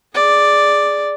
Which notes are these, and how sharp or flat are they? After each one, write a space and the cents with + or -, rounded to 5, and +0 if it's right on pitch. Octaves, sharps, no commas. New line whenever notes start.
G#4 +0 D5 +0